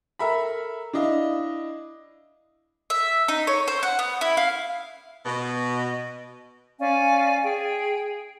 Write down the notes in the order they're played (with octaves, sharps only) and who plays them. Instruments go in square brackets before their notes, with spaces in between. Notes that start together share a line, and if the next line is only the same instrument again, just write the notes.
[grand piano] A4 A#4 E5 A#5 B5
D4 E4 D#5 F5
[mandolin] E5
D#4
C#5
C5
F#5
B3
E4
F5
[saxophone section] B2
[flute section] C#4 D5 F5 G#5
G#4 G5